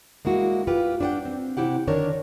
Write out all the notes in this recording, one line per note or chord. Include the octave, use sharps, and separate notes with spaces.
G#3 A#3 E4 F#4
F4 G4 B4
D4 G4 B4 F#5 G5
C4
C3 A#3 C4 E4 G4 F#5
D3 D#3 D4 A#4 C#5